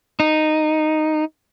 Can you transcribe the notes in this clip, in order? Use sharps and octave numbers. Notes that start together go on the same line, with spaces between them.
D#4